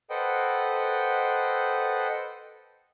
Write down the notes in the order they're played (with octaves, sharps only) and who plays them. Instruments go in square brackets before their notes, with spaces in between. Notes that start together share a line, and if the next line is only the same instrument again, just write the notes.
[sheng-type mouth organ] A4 B4 C5 D#5 F#5 G5